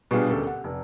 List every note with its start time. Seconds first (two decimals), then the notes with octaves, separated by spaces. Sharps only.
0.11 B2 G3 B3 D4 F4 G#4
0.30 D2 C#3 G4 A4 A#4
0.47 F#5
0.64 F1